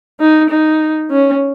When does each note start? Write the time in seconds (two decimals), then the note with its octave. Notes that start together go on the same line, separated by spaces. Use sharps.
0.20 D#4
0.50 D#4
1.11 C#4